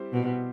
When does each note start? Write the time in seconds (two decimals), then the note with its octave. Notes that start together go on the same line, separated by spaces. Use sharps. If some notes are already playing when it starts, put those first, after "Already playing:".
Already playing: G3 C4 E4 G4 C5
0.13 B2